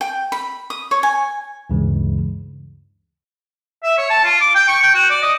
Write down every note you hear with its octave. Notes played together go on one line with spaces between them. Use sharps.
G5
B5
D#6
C#5
G#5
D2 G2 C#3 E3 G#3
E5
C#5
A5
F4
D6
G5
C#6
G5
F#4
D5
D#5